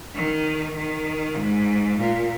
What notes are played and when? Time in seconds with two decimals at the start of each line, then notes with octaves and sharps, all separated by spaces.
0.15 D#3
0.76 D#3
1.37 G#2
1.99 A#2